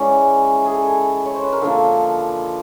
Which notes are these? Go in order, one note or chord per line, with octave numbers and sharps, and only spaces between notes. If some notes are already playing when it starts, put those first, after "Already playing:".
Already playing: E3 G#3 C#4 D5
G#4
A4
C#5
C5
B4
A#4
D3 F3 A#3 A4